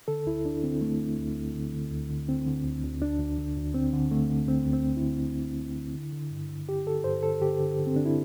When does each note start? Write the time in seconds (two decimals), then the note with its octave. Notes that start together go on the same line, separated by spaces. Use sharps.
0.08 D3 A4
0.26 D2 E4
0.44 D2 D4
0.64 D3 C4
0.81 D3 A3
1.01 D3
1.18 D2
1.36 D2
1.55 D3
1.74 D3
1.91 D2
2.10 D3
2.29 D3 C4
2.47 D3
2.65 D2
2.83 D2
3.01 D2 D4
3.19 D2
3.38 D3
3.56 D2
3.74 D3 C4
3.93 D3
4.11 D3 A3
4.30 D3
4.48 D2 C4
4.66 D2
4.73 C4
4.85 D2
4.97 E4
5.03 D3
5.22 D3
5.40 D2
5.58 D2
5.76 D3
5.94 D3
6.13 D3
6.31 G2
6.49 D3
6.68 D3 G4
6.87 D3 A4
7.04 G2 C5
7.22 D3 A4
7.42 D3 G4
7.60 D3
7.79 D3
7.87 C4
7.96 D3 D4
8.05 E4